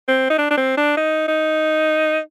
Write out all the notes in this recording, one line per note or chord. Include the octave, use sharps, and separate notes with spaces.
C4
D#4
D4
D4
C4
D4
D#4
D#4